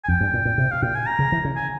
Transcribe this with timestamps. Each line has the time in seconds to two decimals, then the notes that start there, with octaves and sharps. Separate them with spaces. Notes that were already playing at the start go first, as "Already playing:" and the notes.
0.04 G#5
0.08 F2 G5
0.21 G2
0.34 A#2
0.45 A#2
0.58 C3
0.71 F5
0.82 A#2 G5
0.95 G#5
1.06 A#5
1.19 C#3
1.32 E3
1.45 C#3
1.56 G#5